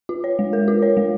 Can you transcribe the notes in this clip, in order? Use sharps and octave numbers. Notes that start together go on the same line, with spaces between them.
F4
C#5
G#3
A#4
F4
C#5
G#3